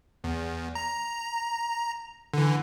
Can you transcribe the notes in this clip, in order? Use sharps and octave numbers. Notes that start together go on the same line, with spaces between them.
E2
A#5
D3 E3